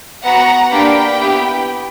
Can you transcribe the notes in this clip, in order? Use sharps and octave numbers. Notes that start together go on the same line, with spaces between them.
B3 F#4 F#5 A#5
A#3 D4 G4 G5 B5
B3 E4 G4